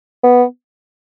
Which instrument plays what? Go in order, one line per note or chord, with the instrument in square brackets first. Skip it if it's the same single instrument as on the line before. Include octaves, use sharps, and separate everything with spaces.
[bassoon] B3